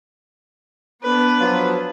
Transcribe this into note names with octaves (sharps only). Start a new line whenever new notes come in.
B3 D4 B4
F3 F#3 F4